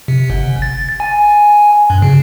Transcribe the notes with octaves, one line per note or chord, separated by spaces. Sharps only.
C3
G1
A6
G#5
G2
C#3